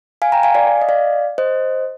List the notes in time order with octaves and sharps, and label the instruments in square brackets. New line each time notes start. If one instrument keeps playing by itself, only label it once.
[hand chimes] F5 G#5
G5 A#5
F5 G#5
D5 F5
D#5
D5 F5
C5 D#5